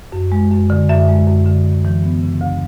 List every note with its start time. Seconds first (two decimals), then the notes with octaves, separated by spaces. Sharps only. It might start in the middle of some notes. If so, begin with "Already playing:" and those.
0.12 F#2
0.32 G#3
0.51 F#2
0.70 D3
0.89 F#2 E5
1.08 G#3
1.28 F#2
1.46 D3
1.65 D2
1.85 E3
2.04 B3
2.22 C#3
2.41 D2